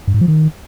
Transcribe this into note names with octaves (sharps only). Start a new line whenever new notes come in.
G2
G#2
F3
D#3